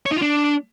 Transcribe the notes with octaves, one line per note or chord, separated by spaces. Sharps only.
C#5
D#4
F4
D4